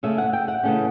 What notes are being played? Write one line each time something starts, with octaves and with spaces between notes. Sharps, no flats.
C#3 E3 A3 C#4 E5
F#5
G5
F#5
C#3 E3 A3 C#4